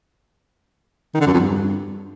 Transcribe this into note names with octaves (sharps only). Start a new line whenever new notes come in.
D#3
D3
F#2
F2
G2